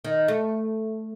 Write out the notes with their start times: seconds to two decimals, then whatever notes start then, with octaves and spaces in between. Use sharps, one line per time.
0.05 D#3
0.28 A3